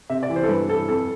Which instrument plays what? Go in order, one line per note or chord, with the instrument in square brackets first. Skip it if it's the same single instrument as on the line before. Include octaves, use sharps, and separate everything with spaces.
[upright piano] C3 E5
D5
E3
C5
A4
G2 B4
E3 A4
F2 A4